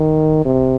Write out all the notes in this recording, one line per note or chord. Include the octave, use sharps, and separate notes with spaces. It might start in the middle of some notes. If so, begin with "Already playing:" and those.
Already playing: D#3
C3